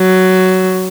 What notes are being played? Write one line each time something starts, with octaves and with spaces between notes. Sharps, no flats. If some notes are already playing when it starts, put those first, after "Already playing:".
Already playing: F#3